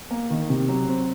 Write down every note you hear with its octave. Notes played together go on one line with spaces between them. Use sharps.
A#3
D#3
C3
F#3
C4